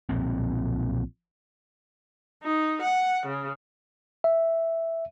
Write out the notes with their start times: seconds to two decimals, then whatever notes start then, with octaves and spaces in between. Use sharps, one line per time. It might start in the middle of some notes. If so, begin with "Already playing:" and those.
0.09 B1 A#2 F3 C4
2.43 D#4
2.81 F#5
3.25 C#3
4.24 E5